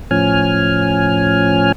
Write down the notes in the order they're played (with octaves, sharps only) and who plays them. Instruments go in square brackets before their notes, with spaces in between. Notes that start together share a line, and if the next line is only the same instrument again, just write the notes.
[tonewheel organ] A2 F3 C#4 G#5 F6